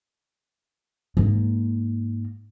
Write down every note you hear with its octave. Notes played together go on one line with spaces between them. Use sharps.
G#2 A#3